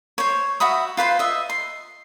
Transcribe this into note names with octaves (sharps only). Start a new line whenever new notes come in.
C5 C#5
F#4 E5 B5 D#6
F4 B4 C5 C6
D#5 E5
C6